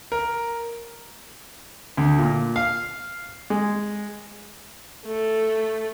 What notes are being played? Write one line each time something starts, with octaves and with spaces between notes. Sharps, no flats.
A#4
D2
A#2
F5
G#3
A3 A4